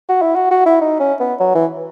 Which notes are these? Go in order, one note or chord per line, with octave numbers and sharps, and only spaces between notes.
F#4
E4
F#4
F#4
E4
D#4
C#4
B3
F#3
E3